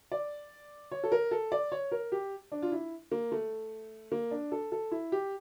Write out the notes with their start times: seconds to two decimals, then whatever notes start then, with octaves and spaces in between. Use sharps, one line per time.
0.12 D5
0.92 C#5
1.04 A4
1.12 A#4
1.31 A4
1.52 D5
1.72 C#5
1.92 A#4
2.12 G4
2.52 D4
2.62 F4
2.72 E4
3.12 A#3
3.32 A3
4.12 A#3
4.31 D4
4.52 A4
4.72 A4
4.91 E4
5.12 G4